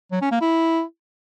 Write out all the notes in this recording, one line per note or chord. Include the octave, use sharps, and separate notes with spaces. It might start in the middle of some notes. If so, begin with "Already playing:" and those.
F#3
C#4
A#3
E4